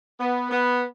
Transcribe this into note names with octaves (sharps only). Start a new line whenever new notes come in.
B3
B3